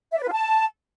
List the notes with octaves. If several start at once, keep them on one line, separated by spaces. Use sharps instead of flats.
E5
D5
B4
F4
A5